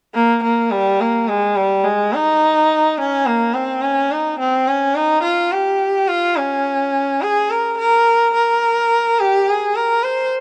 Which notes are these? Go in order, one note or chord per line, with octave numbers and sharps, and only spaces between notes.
A#3
A#3
G3
A#3
G#3
G3
G#3
D#4
C#4
A#3
C4
C#4
D#4
C4
C#4
D#4
F4
G4
F4
C#4
G#4
A#4
A#4
A#4
G4
G#4
A#4
C5